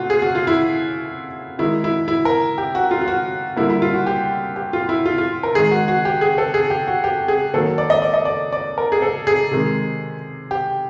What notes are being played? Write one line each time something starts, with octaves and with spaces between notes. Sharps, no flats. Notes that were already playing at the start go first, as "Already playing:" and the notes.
Already playing: A#2 A3 F4 F#4
G#4
F#4
F4
E4
D#3 G#3 E4
E4
E4
A#4
G4
F#4
F4
F4
F#4
D3 G3 A#3 E4
E4
F4
F#4
G4
G4
F4
E4
F4
F4
A#4
D#3 G#3 G#4
F#4
F#4
G4
G#4
A4
G#4
G4
F#4
G4
G#4
D#3 F#3 A#3 A4
D5
D#5
D5
D#5
D5
D5
A#4
G#4
A4
G#4
C3 D#3 G#3
G4